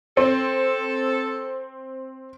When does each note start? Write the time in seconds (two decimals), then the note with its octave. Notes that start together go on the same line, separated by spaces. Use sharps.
0.17 C4 A4